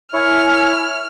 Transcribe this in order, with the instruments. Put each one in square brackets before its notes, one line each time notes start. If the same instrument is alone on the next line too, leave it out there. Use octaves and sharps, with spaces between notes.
[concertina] E4 C#5 [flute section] A#4 E5 G#5 [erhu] F6